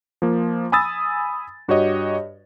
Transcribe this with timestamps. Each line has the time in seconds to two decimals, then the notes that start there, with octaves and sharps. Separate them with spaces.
0.22 F3 A#3
0.72 G#5 B5 D#6 E6 A6
1.68 G2 F#4 G4 C#5 D#5